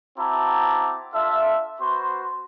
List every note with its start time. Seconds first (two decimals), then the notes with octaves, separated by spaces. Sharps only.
0.18 C4 E4 F#4 A5 A#5 D6
1.14 D4 F4 A4 E5
1.81 B3 F#4 C5 C6